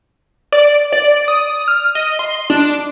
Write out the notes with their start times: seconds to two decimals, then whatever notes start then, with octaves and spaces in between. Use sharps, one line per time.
0.52 D5
0.93 D5
1.28 D#6
1.68 F6
1.95 D#5
2.19 C6
2.50 D4